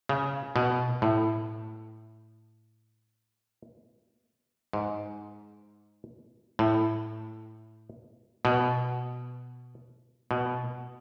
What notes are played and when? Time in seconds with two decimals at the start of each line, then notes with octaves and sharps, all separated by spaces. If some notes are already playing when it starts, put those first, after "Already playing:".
0.09 C#3
0.56 B2
1.02 A2
4.73 G#2
6.59 A2
8.45 B2
10.31 B2